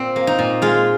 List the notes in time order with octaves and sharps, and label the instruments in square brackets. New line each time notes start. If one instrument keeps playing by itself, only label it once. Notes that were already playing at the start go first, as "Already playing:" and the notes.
Already playing: [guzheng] A#2 C4
A#3
D#4
A#2
G#3 F4